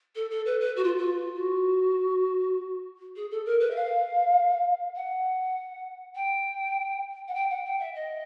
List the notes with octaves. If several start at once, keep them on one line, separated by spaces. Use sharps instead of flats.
A4
A4
B4
B4
F#4
F4
F4
F#4
G#4
A4
A#4
B4
E5
F5
F#5
G5
F#5
G5
F#5
G5
E5
D#5